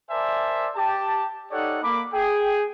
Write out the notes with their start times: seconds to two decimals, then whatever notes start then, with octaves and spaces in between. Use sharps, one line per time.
0.11 A#4 C5 D5 E5 G#5 A5
0.76 G4 A5
1.52 D#4 G4 A4 C#5 D5 F#5
1.83 A#3 B5 D6
2.13 G#4 G5